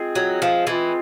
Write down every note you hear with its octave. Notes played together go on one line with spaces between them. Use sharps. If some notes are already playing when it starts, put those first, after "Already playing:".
Already playing: G#3 C4 F4 G#4
F#3
F3
E3 G#3 C4 F4 G#4